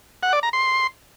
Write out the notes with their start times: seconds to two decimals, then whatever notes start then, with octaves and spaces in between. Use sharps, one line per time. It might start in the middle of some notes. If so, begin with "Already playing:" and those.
0.23 F#5
0.33 D5
0.43 A#5
0.53 C6